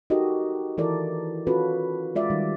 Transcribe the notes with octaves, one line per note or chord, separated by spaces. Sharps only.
D#4 F#4 G4 A4 A#4 D#5
D#3 E3 E4 A4 A#4 D5
C#4 F4 F#4 A4 B4
G#3 F4 D5 E5
D#3 G3